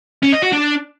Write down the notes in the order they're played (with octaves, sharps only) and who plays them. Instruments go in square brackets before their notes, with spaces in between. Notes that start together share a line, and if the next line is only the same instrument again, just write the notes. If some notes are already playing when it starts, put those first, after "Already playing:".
[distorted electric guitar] C#4
D#5
F#4
D4